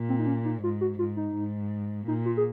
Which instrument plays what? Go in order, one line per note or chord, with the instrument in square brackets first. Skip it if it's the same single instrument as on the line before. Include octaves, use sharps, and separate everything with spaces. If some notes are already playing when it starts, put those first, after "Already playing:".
Already playing: [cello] A#2
[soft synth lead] C4
D#4
C#4
D#4
[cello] G#2 [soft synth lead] F4
[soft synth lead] F#4
[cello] G#2 [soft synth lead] F4
[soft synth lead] D#4
[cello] G#2
[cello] A#2 [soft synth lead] D#4
[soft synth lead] F4
G#4